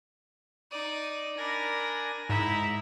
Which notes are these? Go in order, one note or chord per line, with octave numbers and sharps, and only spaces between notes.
D#4 D5 D#6
D4 A#4 G#5 B5 A#6
G#2 D#4 E4 E5 A#5